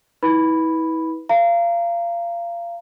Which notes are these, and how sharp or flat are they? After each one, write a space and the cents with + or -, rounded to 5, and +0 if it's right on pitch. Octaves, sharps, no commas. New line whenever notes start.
E4 -40 B4 -10 B5 +0
F5 -25 A#5 -15